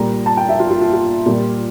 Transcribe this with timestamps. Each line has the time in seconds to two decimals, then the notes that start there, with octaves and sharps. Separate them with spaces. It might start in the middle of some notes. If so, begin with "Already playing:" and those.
Already playing: A#2 G3 A#5
0.26 A5
0.37 G5
0.49 E5
0.60 F4
0.70 F4
0.82 F4
0.93 F4
1.26 A#2 G3